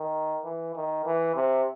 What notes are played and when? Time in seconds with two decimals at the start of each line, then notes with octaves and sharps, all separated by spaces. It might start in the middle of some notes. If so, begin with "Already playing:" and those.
Already playing: D#3
0.44 E3
0.75 D#3
1.05 E3
1.35 C3